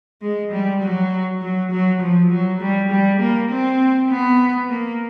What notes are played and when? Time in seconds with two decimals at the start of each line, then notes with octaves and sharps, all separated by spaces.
0.22 G#3
0.52 G3
0.82 F#3
1.42 F#3
1.71 F#3
2.01 F3
2.31 F#3
2.61 G3
2.91 G3
3.20 A#3
3.50 C4
4.10 B3
4.70 A#3